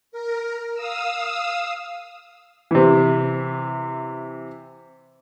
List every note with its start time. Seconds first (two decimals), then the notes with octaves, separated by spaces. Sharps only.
0.12 A#4
0.74 F5 D#6 E6
2.71 C3 E3